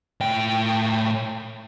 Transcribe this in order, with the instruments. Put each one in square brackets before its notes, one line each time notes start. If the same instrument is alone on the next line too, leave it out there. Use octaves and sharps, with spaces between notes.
[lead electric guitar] A2 G5